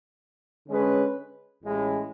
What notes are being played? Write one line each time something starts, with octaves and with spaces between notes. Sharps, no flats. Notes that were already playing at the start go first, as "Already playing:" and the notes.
D3 G#3 C#4 G#4 B4
A1 A2 G#3 C#4 E4